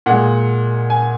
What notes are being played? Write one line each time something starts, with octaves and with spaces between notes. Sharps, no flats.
A#2 G#3 F#5
G#5